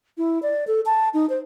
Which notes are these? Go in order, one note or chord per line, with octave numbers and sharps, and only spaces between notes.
E4
D5
A4
A5
D#4
C5